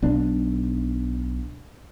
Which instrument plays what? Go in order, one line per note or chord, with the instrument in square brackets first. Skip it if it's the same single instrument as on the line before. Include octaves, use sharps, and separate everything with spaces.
[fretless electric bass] B1 D4